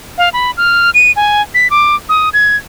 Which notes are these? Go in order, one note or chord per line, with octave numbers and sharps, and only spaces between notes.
F5
B5
F6
D#7
G#5
B6
D6
D#6
G#6